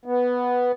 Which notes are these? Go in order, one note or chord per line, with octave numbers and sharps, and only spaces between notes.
B3